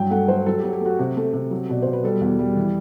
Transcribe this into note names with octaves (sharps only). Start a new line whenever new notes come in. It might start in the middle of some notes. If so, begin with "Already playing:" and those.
Already playing: G2 F#3 G5
A3 F#5
F#3 C5
F#3 A4
F#3 G4
G4
A3 F#4
C3
A3
C3
F#3
B2 D5
B2 C5
B4
G3 A4
E2
G3
E3